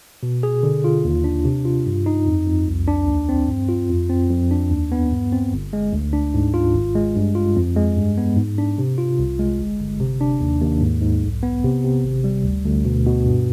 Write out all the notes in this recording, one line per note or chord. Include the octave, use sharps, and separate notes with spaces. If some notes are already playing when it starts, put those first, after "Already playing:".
B2
G#4
D3
F4
D#2
D4
C3
F4
G2
D#4
F2
F2
C2
D4
D#2
C4
G2
F4
F2
C4
F2
D4
D#2
B3
G2
C4
G1
G#3
D2
D4
G#2
F4
G#1
G#3
G2
F4
F2
G#3
G2
B3
G#2
D4
C3
F4
C2
G#3
G1
G1
C3
D4
D#2
D#2
G#2
G#2
B1
B3
C3
C3
G#1
G3
D2
D2
B2
B2
G2